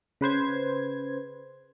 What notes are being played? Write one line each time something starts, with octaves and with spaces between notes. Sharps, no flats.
C#3 B4 C5 G#6